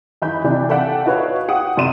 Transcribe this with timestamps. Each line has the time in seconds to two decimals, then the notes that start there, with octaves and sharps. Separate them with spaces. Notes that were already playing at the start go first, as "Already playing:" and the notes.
0.22 F#2 E3 D#4 B5 G6
0.44 C3 E3 D4
0.69 A4 D5 E5 F#5 G5
1.06 D#4 F#4 B4 C#5 F5
1.48 G4 F#5 D#6
1.77 F#2 C3 D5 C6 D#7 E7